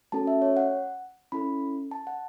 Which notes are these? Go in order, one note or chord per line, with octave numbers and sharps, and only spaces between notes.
A3 C#4 F#4 A4 A5
E5
C#5
F#5
C#4 E4 A4 B5
A5
F#5